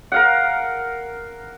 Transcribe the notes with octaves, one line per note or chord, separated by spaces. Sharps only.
A#4 F5 F#5